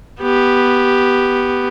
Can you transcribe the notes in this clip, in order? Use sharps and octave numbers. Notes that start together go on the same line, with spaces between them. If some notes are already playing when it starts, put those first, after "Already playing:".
B3 G4